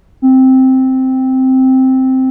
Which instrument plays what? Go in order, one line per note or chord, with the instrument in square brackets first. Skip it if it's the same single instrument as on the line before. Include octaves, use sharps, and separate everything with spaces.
[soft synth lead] C4